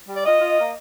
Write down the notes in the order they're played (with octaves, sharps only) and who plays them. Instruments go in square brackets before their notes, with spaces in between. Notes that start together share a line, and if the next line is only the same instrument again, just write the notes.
[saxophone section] G3
D5
F4 D#5
F4
A#3